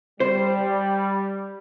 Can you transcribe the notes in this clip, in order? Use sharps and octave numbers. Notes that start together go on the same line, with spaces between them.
G3 C5